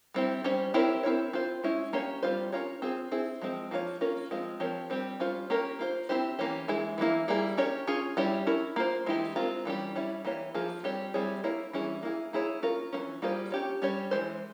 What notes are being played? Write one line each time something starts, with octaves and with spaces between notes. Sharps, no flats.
G3 C4 E4 G4
G3 C#4 G4 C5
C4 E4 G4 A#4 C#5
C4 E4 A#4 C#5
C4 F4 C5
G#3 C#4 E4
A#3 C#4 G4 C#5
G3 C4 F4 C5
C#4 F4 A#4 C#5
C4 F4 G#4 C5
C4 E4 G#4
F3 G#3 C4
F3 A#3 F4 G#4 C#5
A#3 C#4 F4 A#4
F3 G#3 C4 F4
F3 C4 G4 A#4 C#5
G3 C4 G4
G3 C#4 F4 C5
A#3 C#4 G4 A#4
A#3 F4 C5
C4 E4 G4 C5
E3 A#3 C#4 G4
E3 G#3 E4 G#4
E3 G3 A#3 E4
G3 A#3 E4 G#4
C#4 G4 A#4 C#5
C#4 F4 G#4
G3 C#4 E4 G4 C#5
C#4 E4 A#4
A#3 F4 C5
E3 G#3 E4 G4
G#3 C4 F4 A#4
E3 G3 C#4 G4
G3 C#4 E4
E3 A#3 E4 G4 C#5
F3 A#3 F4 G#4
G3 C4 G4 C#5
G3 C4 E4 G#4 C#5
A#3 E4 A#4 C#5
E3 G3 C#4 E4 G#4
A#3 E4 G#4
A#3 E4 G#4 C#5
C#4 F4 A#4
E3 A#3 C#4
G3 A#3 F4 G#4 C5
C#4 G4 C#5
G3 C#4 G4 C#5
E3 G#3 C5